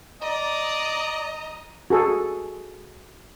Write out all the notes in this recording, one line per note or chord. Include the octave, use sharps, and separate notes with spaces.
D5 D#5 A#5
F#4 G#4 A4